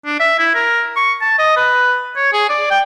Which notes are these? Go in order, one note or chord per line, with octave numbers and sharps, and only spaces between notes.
D4
E5
E4
A#4
C#6
A5
D#5
B4
C#5
G#4
D5
G5